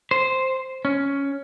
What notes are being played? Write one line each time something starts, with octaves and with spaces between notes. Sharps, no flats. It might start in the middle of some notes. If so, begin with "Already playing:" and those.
C5
C#4